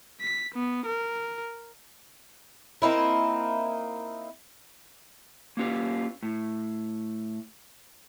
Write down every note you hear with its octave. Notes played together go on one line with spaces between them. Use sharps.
B6
B3
A#4
A#3 C4 D#4 E4
A#3 C#4 F4 G4 B4
A2